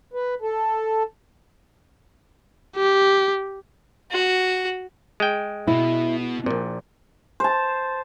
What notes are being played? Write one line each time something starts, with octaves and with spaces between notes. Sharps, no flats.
B4
A4
G4
F#4
G#3 G5
B2 E4
A#1 A#2 D5
C5 A5